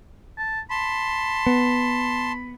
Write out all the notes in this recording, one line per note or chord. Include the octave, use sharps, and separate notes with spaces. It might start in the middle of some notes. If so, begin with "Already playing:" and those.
A5
A5 B5 C6
B3